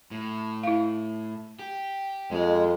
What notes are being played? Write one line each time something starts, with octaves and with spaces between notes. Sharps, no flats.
A2
E4 F5
G4
F2 G#3 D#5